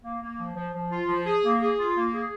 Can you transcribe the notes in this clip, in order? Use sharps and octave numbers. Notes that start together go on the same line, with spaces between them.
A#3
A#3
F3
F3
F3
F4
F3
G#4
A#3
G#4
F4
A#3
G#4